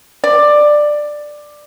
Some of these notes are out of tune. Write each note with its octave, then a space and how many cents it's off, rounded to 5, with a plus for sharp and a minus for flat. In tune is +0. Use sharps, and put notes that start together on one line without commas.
D5 +10